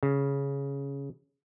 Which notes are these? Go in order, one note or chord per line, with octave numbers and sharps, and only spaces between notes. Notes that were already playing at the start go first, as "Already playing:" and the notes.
C#3